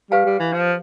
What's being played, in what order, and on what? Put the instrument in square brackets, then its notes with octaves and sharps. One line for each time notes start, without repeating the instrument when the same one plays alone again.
[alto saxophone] G3 [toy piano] G4 B4 F5 A5
[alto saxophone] G3
E3
F3